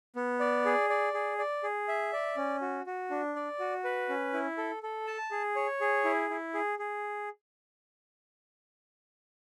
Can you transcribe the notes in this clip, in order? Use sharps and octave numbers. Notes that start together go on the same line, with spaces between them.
B3
D5
G#4
D5
G#4
D5
G#4
E5
D5
C#4
F#4
F#4
D4
D5
F#4
B4
C#4
E4
A4
A4
A5
G#4
C#5
G#4
E4
E4
G#4
G#4